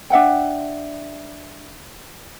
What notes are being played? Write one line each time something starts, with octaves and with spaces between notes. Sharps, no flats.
D4 E5 F#5 G5